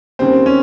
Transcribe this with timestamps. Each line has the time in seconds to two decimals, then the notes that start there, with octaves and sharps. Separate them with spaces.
0.19 D#2 C#3 G3 C4
0.46 C#4